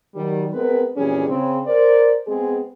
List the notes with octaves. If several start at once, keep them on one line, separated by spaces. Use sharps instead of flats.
D#3 F#3 G3
G#3 B3 C4 A#4 B4
F2 A#2 E3 G3 C#4 G#4
C#3 C4
A#4 C5 D5
G#3 B3 C4 G#4